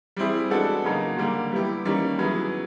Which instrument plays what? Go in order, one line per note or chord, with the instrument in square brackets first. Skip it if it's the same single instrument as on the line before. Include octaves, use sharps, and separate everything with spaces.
[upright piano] G3 C4 E4 G#4
G#3 B3 D4 F#4 A4
C#3 F#3 A#3 D#4
D3 G3 A#3
G3 B3 E4 G4
D#3 G3 A#3 C#4
F#3 B3 E4 G#4